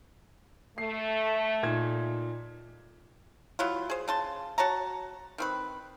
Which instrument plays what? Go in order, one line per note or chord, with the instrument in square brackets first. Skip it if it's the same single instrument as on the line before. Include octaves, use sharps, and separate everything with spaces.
[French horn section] A3 [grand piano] C7
[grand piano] A#2 D#4 G#6
[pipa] E3 F#3 E4 F4
G#4 C5
C#3 A5 C6
F#4 C#5 A5 A#5
D#3 C4 B4